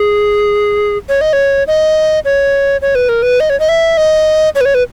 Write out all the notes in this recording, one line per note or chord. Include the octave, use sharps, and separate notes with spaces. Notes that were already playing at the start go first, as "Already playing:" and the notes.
Already playing: G#4
C#5
D#5
C#5
D#5
C#5
C#5
B4
A#4
B4
D#5
C#5
D#5
E5
D#5
C#5
B4
C#5
B4